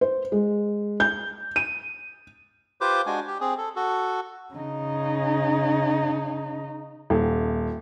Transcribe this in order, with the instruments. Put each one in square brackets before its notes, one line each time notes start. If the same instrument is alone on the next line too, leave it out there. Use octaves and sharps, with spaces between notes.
[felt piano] C5
G#3
G6
D#7
[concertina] F4 G4 B4 C5 D6
G#3 D4 F#4 G#5
G4
C4 G#4
A4
F#4 A4
[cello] C#3 D#4
[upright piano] D#1